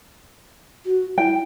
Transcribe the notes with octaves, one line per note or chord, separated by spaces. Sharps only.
F#4
E4 G5